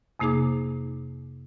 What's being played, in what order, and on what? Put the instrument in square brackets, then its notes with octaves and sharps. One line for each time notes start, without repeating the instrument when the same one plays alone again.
[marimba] F2 C3 A#3 D#4 G#4 D6